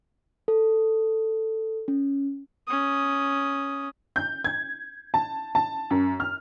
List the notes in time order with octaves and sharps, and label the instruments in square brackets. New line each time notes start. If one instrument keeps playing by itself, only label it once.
[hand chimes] A4
C#4
[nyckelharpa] C#4 D#6
[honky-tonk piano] G6
G#6
A5
A5
F#2
F6